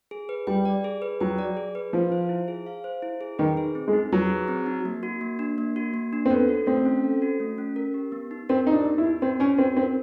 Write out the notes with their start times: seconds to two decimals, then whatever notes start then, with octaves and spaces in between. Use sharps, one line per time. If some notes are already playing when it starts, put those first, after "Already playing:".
0.11 G#4
0.29 B4
0.47 G3 G5
0.65 D5
0.84 G#4
1.02 B4
1.20 F#3 G5
1.38 D5
1.57 G#4
1.75 B4
1.93 F3 F5
2.12 C5
2.29 E4
2.48 G#4
2.66 F5
2.84 C5
3.02 E4
3.21 G#4
3.39 D#3 B4
3.57 G#4
3.75 C4
3.88 G#3
3.93 D#4
4.12 F#3 B4
4.30 G#4
4.48 C4
4.66 D#4
4.85 A#3
5.03 F#4
5.21 A#3
5.39 D4
5.58 A#3
5.76 F#4
5.94 A#3
6.13 D4
6.26 C4
6.30 B3 A4
6.49 F#4
6.67 A3 C4
6.85 C#4
7.04 A4
7.22 F#4
7.40 A3
7.58 C#4
7.76 A#4
7.94 G4
8.12 B3
8.31 D#4
8.49 C4 A#4
8.67 D#4 G4
8.73 D4
8.85 B3
8.98 E4
9.04 D#4
9.22 C4 F#4
9.40 C#4 C#5
9.58 C4 F#4
9.77 C4 A#4